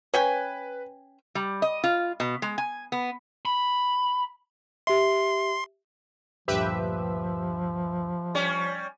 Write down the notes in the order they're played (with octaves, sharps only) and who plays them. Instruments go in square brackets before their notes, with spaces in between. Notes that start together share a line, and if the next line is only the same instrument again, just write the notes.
[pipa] C#4 G5 G#5 [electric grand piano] B4
[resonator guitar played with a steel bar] G3
D#5
F4
B2
G#3
G#5
B3
[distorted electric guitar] B5
[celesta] G4 E5 [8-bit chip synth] C6
[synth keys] D2 G2 A#2 [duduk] F3 [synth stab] G4 B4 E5
[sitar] G3 C#4